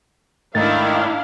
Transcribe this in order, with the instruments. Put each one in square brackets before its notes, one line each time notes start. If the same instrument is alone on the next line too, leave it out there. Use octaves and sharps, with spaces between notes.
[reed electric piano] G#2 A3 A6 [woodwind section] D#3 [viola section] D4 E4 F5